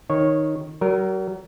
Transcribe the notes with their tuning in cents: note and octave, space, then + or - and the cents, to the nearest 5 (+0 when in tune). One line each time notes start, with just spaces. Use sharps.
D#3 +0 C#5 -10
F#3 +40 A#4 +0